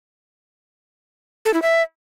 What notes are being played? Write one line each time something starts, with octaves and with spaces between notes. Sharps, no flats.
A4
E4
E5